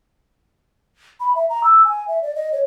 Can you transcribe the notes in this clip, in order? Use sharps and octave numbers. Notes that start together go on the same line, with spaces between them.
B5
E5
A#5
E6
G#5
E5
D5
D#5
C#5